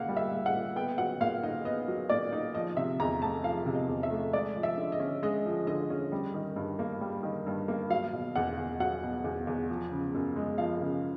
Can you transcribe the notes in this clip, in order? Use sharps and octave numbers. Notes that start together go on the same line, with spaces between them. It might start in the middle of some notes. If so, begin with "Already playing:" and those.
Already playing: A#2 A#3 F5 F#5
G3
E5
A#2
F#5
A#2
B3 G5
F#3 F#5
A#2 F5
D#4 D#5
B3 D#5
F#3
A#2 D5
D#4
F3 D#5
C3 E5
E2 A#5
A3 A5
F3 F5
C3
D#5
E2
E5
A3
G#3 D5
F3
E5
D3
D#5
C#4
G#3 D#5
F3
D3 D#5
C#4
G3
D#3
G2
A#3
G3
D#3
G2
A#3
F#3 F5
B2
E2 F#5
E2
F#3 F#5
B2
E2
E2
F3
C#3
F#2
G#3
F3 F5
C#3